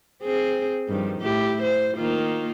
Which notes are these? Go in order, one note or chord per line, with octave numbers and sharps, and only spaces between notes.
C4 G#4
G2 D#3 F3
A2 E4 G4
C5
D#3 A#3 F4